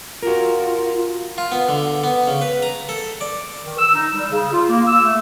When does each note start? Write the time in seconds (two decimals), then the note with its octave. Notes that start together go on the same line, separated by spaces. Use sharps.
0.23 F4 F#4 A#4
1.38 F4
1.52 B3
1.69 D3
2.04 B3
2.27 C#3
2.42 B4
2.62 A#5
2.89 A4
3.21 D5
3.64 D#3
3.78 E6
3.94 D#4
4.14 G3
4.31 C#3
4.53 F4
4.69 A#3
4.87 E6
5.03 A3